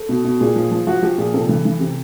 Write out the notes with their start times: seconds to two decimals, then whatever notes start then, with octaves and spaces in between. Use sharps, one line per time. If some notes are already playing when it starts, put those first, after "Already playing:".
Already playing: A4
0.09 B2
0.24 B2
0.40 A#2 G#4
0.56 F3
0.71 F3
0.87 F3 F#4
1.02 F3 G4
1.18 A#2 G#4
1.34 C3 A4
1.49 E3
1.65 E3
1.80 C3